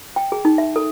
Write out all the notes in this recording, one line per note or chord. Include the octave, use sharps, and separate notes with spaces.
G5
G#4
D#4
E5
A4